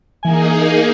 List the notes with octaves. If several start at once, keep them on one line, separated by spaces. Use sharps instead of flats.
E3 A#3 D#4 G#4 G#5